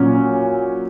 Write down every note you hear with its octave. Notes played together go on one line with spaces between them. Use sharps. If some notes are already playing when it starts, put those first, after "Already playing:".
Already playing: A#2 F#3 C#4